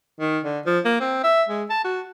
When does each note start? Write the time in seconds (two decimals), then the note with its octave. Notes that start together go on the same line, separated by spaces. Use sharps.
0.21 D#3
0.45 D3
0.66 F3
0.86 A#3
1.01 C4
1.24 E5
1.49 G#3
1.70 A5
1.85 F#4